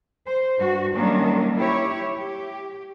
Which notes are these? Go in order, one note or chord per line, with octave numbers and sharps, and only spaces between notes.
C5
G2 F#4
D#3 F#3 G3 A#3 C#4 D4
E4 G4 C#5
G4